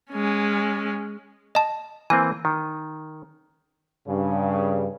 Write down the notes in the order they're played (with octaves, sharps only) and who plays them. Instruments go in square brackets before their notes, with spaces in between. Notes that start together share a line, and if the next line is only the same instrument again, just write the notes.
[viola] G#3 C#4
[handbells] D#5 A5
[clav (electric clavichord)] E3 A#3 C4 [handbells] G#5
[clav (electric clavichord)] D#3
[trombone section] G2 C#3